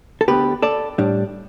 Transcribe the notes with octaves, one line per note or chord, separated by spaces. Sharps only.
A4
D2 D3 B3 G4 B4
A4 D5
A2 G3 D4